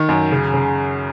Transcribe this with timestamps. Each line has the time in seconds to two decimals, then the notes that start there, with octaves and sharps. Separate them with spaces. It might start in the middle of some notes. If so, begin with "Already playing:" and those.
Already playing: D#3
0.09 F#2
0.31 C#3
0.54 C#3